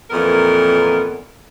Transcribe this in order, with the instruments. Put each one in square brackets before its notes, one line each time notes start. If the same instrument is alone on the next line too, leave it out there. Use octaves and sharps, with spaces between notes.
[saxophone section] F2 A#2 E3 B3 A#4